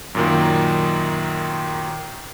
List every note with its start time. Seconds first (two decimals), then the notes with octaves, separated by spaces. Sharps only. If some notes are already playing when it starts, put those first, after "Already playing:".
0.15 F#2 A#2 D#3